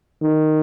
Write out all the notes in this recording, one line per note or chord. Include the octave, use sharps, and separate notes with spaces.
D#3